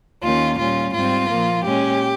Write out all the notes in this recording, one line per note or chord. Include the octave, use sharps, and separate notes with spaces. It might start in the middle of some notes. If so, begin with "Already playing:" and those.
D#2 D#3 A#3 C#4 F4
A#2 G3 C#4 F4
G#2 G3 C4 F4
A#2 F3 A#3
A#2 G#3 C#4 G4